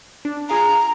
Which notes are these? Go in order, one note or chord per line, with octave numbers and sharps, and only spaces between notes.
D4
F4 G#4 F5 A#5